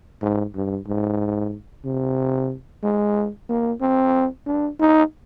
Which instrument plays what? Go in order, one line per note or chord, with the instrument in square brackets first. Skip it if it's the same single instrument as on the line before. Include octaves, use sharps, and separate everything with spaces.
[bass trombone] G#2
G2
G#2
C3
G#3
A#3
C4
D4
D#4